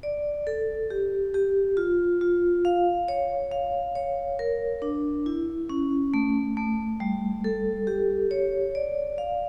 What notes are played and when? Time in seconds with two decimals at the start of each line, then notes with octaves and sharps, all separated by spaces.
0.03 D5
0.47 A4
0.90 G4
1.34 G4
1.77 F4
2.21 F4
2.65 F5
3.08 C#5
3.52 F5
3.95 C#5
4.39 A#4
4.82 D4
5.26 E4
5.69 C#4
6.14 A3
6.57 A3
7.00 G3
7.44 A4
7.87 G4
8.31 C#5
8.75 D5
9.18 F5